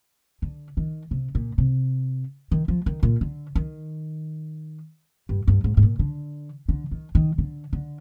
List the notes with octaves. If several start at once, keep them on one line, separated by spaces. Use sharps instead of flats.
D3
D#3
C3
A#2
C3
D#3
F3
D#3
A#2
D3
D#3
G2
G2
G#2
G#2
A#2
D3
D3
D#3
D#3
D3
D3